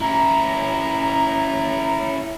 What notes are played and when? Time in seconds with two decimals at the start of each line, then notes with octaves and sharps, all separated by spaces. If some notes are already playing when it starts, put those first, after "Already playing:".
0.01 C#4 E4 A#5